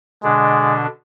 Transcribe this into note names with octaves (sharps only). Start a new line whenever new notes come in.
B2 D3 G#3 D4